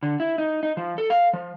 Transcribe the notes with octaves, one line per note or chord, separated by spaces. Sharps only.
D3
E4
D#4
D#4
F3
A4
F5
F3